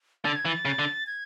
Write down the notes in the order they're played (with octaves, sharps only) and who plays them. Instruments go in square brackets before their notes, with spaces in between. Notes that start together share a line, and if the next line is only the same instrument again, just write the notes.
[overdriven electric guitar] D3 [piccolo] A6
[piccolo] G#6
[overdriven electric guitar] E3
[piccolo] A6
[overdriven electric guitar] C#3
D3
[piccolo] G#6